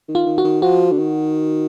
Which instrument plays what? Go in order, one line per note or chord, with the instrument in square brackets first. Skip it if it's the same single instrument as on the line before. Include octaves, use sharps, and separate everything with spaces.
[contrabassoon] D#3
[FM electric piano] F4
[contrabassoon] D#3
[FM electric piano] F#4
[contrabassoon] D#3
[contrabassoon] F3 [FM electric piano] F#4
[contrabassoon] D3
D#3